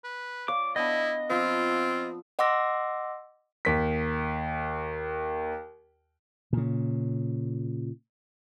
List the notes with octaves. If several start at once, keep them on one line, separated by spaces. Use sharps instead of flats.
B4
C#5 D5 F5 D6
B3 D4 E4 D#5
F3 C4 F4 E6
D#5 F#5 C6 D6 E6 A#6
D#2 B6
A#2 C#3